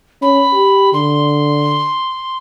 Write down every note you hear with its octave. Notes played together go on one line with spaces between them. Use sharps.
C#4 B5
G4
D3 C6